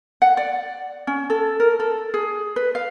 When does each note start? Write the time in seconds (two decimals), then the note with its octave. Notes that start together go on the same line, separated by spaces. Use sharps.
0.22 F#5
0.37 D5
1.07 C#4
1.30 A4
1.60 A#4
1.80 A4
2.14 G#4
2.56 B4
2.75 F5